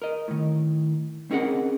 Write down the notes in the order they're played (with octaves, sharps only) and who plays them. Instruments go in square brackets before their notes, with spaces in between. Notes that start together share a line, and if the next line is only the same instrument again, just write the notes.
[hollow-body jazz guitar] A#4 D#5
A2 D#3
C4 C#4 D#4 G#4 A#4 F#5